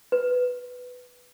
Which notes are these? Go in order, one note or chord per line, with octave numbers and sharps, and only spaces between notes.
B4